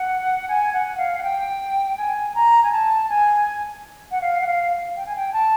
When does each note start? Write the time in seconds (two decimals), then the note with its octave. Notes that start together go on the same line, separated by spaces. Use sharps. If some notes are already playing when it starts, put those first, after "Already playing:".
Already playing: F#5
0.48 G#5
0.72 F#5
0.97 F5
1.18 F#5
1.22 G5
1.97 G#5
2.34 A#5
2.63 G#5
2.71 A5
3.09 G#5
4.11 F#5
4.21 F5
4.41 F#5
4.46 F5
4.96 G5
5.05 G#5
5.15 G5
5.33 A5